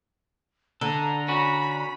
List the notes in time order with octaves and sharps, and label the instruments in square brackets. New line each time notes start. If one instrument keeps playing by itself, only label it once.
[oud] D3 [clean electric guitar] A4 [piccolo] A#5
[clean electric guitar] C#4 F#4 [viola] B5